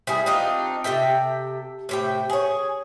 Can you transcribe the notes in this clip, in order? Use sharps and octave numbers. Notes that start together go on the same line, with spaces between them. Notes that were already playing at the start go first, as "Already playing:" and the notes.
G3 E4 G#4
C4 D4 D#4 F4
C3 A4 E5 G5
A2 C3 G5
G#4 C#5